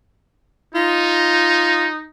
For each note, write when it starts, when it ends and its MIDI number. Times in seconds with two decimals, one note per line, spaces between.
0.75 2.06 63
0.75 1.87 65